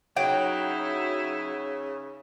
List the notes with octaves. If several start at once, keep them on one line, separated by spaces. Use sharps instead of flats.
C#3 F#3 D#4 E4 G5